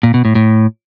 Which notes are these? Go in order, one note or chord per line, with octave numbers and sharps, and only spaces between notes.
A#2
B2
A2
A2